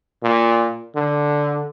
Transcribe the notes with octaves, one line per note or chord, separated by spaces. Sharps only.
A#2
D3